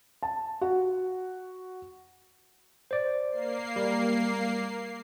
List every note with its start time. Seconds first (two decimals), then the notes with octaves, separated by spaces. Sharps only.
0.22 A5
0.61 F#4
2.91 C5 D5
3.31 A#3 C7
3.76 G3